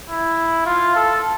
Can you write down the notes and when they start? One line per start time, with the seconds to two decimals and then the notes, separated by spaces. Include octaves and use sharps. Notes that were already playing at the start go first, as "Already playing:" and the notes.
0.10 E4
0.66 F4
0.96 A4